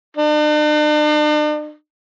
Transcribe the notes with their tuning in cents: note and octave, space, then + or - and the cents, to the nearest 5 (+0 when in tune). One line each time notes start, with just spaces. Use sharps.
D4 +45